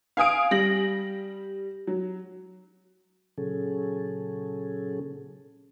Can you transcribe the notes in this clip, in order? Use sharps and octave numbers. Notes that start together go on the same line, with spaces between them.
F5 G#5 D#6 D7
G3 A#6 F#7
F#3
A#2 C#3 F#3 C#4 G#4 A4